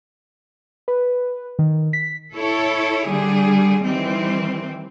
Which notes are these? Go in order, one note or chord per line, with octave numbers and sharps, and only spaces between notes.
B4
D#3
B6
E4 A4 C#5
D3 G3 G#4
D#3 E3 G3 C4